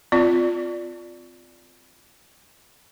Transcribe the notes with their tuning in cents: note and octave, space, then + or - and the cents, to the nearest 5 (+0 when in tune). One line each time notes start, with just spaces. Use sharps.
C4 -30 F4 +0 D5 +0